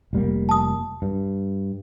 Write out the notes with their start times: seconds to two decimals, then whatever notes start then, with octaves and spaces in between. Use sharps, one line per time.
0.13 F1 G3 A#3
0.49 A5 D#6
1.02 G2